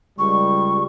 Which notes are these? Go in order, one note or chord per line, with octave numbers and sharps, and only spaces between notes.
C#2 G3 C#6